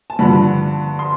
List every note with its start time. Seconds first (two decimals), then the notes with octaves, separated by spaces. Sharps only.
0.10 A5
0.19 G2 D3 F3 B5
0.99 C6